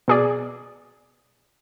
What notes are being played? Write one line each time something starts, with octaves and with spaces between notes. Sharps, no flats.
B2 G#4 D5